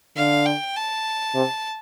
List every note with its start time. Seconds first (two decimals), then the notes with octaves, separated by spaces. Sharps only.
0.17 D3 F5
0.46 G5
0.76 A5
1.35 C3